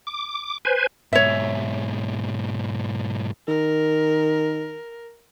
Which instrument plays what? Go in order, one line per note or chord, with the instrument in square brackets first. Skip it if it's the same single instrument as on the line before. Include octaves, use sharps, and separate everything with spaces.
[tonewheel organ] D6
B4 C5 G#5
[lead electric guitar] G#2 B2 [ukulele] C#5 E5
[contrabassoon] D#3 [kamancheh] A#4